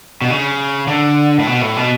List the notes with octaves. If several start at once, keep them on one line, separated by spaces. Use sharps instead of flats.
B2
C#3
D3
A2
B2
A2
B2